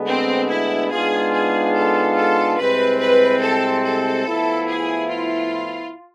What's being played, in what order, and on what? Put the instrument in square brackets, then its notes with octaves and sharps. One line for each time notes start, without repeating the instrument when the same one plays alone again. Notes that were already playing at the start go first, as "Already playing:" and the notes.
Already playing: [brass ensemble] D2 D3 G#3 B3
[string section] C4
E4
[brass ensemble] G#2 G#3 B3 D4 F4 [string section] G#4
[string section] G#4
A4
A4
[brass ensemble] C2 C3 G#3 C4 [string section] B4
[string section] B4
A4
A4
[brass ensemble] A2 F3 B3 E4
[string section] G#4
F4